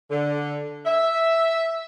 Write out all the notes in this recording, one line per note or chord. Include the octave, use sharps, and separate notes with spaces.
D3
E5